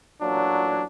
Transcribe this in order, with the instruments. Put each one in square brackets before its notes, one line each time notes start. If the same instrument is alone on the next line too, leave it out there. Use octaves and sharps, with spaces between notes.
[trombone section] A1 A#2 F#3 [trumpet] D4